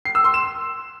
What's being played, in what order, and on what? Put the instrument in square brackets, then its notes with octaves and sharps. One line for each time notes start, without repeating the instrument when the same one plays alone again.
[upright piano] C7
E6
C6
E7